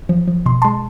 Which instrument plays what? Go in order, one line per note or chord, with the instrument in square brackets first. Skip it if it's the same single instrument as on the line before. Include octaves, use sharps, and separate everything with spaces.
[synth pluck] F3
F3
B2 C6
G#3 A5 C6